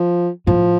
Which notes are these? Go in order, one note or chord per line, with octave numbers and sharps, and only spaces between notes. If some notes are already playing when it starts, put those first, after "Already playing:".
Already playing: F3
A2 F3